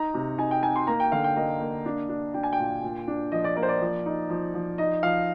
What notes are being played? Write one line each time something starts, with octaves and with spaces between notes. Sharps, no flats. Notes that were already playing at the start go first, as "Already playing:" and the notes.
Already playing: D#4 A#5
C3
D#4 G#5
G5
D#4 G#5
C6
A#3 A#5
G5
D3 F5
G5
A#3 D#5
A#3
D4
D4
D4 G5
G#5
G5
A#2
A#2
D4
F3 D#5
D5
A#3 D5
C5
D5
F3
D#4
F3
F3
D#4 D#5
F3 F5